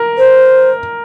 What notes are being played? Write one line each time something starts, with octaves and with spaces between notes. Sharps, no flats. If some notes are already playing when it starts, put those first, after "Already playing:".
Already playing: A#4
C5